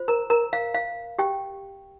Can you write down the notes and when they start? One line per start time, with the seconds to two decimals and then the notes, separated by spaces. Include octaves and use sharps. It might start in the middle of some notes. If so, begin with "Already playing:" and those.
Already playing: F4 C5
0.08 A#4 A#5
0.30 A#4 A#5
0.53 F5
0.75 F5
1.19 G4 G5